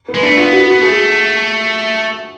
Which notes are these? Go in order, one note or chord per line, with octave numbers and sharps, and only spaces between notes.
B3
G#3
A3 D4
B3 F4
F#4
F#4
A3 G#4